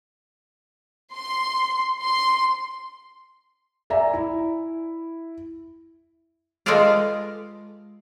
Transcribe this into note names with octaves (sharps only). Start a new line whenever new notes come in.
C6
C6
D5 E5 G#5 A#5
E4
G#3 F4 A4 B4 D5 F5